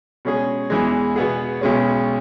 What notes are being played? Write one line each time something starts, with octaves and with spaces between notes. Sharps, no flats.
B2 G#3 C#4 G#4
E2 E3 G#3
B2 B3 G#4
B1 B2 G#3 C#4